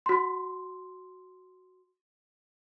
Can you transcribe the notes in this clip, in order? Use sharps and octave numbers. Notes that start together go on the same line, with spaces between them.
F#4 C6